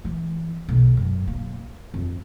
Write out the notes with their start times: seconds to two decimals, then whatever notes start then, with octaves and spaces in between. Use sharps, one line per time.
0.05 E3
0.69 B1
0.97 F#2
1.27 A#3
1.94 F2